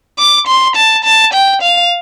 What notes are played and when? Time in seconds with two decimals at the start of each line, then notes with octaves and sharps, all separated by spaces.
0.19 D6
0.47 C6
0.76 A5
1.04 A5
1.34 G5
1.62 F5